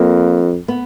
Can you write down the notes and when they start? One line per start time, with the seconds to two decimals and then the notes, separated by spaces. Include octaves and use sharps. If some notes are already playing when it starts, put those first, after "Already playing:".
Already playing: F2 A#3
0.68 B3